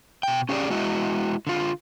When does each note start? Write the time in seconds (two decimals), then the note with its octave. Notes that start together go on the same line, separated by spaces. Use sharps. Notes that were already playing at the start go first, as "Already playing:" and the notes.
0.23 B2 G5
0.49 C#4 G4 G#4 B4 D5
0.70 G#3 E4 F#4 D#5
1.47 D3 F4